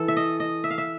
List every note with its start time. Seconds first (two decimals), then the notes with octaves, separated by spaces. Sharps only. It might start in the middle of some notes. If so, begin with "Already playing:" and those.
Already playing: E3 A4
0.08 E5
0.17 D#5
0.40 D#5
0.64 E5
0.70 F5
0.78 E5